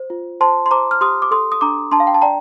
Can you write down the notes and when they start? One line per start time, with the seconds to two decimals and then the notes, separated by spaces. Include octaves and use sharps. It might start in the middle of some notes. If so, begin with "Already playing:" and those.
Already playing: C5
0.10 F4
0.41 C5 A5 C6
0.66 C6
0.71 C5 A#5 D6
0.91 F6
1.01 G4 C6 D#6
1.22 D6
1.31 A4 C6 D#6
1.52 D#6
1.61 D4 A#5 D6
1.91 D4 A5 C6
2.00 F5
2.07 G5
2.14 A5
2.22 D5 G5 A#5